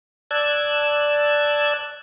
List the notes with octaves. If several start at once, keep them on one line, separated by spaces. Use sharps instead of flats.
D5 A5 E6 F#6 G#6